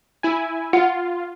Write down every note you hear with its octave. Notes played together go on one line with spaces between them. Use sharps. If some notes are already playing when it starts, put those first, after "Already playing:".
E4 G#5
F4 F#5